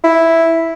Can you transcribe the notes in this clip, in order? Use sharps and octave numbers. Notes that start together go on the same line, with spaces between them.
E4